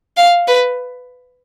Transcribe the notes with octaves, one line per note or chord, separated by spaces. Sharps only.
F5
B4